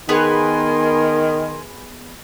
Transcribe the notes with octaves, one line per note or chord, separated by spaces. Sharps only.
D#3 B3 G#4 A#4 B4 G#5 C6